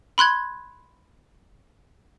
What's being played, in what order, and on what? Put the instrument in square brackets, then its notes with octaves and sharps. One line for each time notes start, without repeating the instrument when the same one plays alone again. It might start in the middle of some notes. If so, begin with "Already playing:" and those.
[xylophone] B5 C6 F#6 G#6